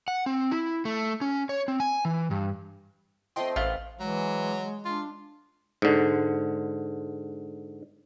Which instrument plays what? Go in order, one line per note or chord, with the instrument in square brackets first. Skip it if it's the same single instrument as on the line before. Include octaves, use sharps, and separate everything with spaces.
[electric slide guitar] F#5
C4
E4
A3
C#4
C#5
C4
G#5
E3
G2
[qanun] F3 A3 C4 [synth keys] D#5 G5 C6
[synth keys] A1 [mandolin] F4 [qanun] B4 F#5 A#5 [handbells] C5 E5
[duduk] E3 [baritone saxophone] F#3 [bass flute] G#3
[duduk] D4 [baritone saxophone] F4
[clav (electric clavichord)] G#2 D3